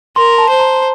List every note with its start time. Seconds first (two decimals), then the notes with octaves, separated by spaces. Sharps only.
0.16 A#4 C6
0.38 A5
0.49 C5
0.60 A#5